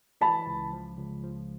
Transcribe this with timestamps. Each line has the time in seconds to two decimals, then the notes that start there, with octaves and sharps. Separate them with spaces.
0.21 E3 A5 B5
0.47 C#2
0.72 F3
0.97 C#2
1.24 F3